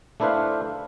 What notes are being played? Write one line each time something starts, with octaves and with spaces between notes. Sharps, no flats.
A3 D4 E4 B4 C5 F5